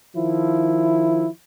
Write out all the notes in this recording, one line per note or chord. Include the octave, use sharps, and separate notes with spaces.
D#3 F3 E4